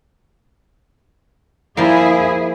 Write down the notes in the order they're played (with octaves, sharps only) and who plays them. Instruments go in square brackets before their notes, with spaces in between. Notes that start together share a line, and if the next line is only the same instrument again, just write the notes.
[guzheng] F3 A#3 [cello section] E4 G#4